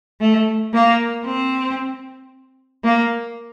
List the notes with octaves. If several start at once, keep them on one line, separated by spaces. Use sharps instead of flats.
A3
A#3
C4
A#3